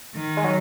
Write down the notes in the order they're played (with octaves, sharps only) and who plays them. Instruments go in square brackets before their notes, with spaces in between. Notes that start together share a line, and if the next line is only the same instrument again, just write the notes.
[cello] D#3
[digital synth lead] G#3
F#3